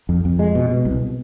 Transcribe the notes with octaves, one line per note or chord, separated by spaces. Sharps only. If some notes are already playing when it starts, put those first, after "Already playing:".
F2
F2
G#3
B2
B2
C2